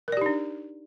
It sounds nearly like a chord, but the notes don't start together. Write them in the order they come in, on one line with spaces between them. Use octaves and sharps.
A#4 D5 G4 D#4 D4